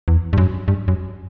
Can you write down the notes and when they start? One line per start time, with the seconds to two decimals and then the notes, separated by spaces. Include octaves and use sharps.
0.08 E2
0.33 G2
0.38 F#2
0.68 G2
0.88 F#2